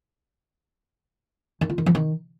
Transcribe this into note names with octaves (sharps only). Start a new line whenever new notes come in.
D#3
F4
D#3
F3
D#3